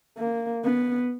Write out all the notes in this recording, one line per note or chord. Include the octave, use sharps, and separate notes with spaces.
A#3
B3